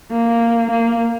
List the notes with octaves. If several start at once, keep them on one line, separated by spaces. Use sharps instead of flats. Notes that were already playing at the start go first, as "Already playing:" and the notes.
A#3
A#3